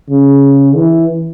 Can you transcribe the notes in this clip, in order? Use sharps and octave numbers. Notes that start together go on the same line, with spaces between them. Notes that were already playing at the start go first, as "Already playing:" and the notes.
C#3
E3